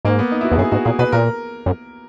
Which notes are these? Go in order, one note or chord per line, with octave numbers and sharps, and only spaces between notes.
G#2 A#3
B3
D#4
E4
F#4
E2
F#2 G#4
G#2 F#4
A#2 G#4
B2 B4
A#2 A#4
F#2